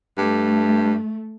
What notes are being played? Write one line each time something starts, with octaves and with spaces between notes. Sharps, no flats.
G2 A3